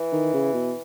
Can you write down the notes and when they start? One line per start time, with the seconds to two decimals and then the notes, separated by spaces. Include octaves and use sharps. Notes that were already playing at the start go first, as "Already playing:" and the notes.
Already playing: E3
0.13 D#3
0.34 C#3
0.54 B2